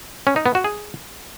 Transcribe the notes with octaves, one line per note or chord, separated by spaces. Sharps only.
C#4
D#4
B3
F#4
G#4